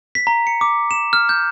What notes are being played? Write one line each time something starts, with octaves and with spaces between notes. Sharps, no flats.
B6
A#5
C#7
D6
E7
F6
G6